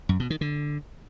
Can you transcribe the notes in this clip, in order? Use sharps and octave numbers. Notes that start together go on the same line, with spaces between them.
F#2
B2
D#3
D3